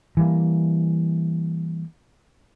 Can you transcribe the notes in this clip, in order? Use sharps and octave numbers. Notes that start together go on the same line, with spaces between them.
E3 G3 A#3